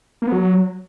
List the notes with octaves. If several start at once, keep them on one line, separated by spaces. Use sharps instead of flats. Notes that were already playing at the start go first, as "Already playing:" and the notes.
A#3
B3
F#3